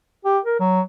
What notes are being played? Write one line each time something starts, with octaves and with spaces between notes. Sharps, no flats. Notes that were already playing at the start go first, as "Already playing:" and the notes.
G4
A#4
F#3